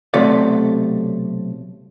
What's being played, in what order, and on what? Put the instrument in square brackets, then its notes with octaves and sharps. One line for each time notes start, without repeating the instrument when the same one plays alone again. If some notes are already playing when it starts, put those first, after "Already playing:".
[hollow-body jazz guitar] B1 C3 F#3 A3 D5